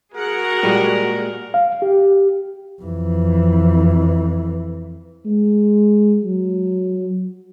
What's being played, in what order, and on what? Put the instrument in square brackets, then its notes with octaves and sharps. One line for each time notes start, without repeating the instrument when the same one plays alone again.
[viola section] F#4 G#4 F#5 [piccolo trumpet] A#4
[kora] A#2 G3 G#3
[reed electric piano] F5
G4
[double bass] F2 E3
[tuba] G#3
F#3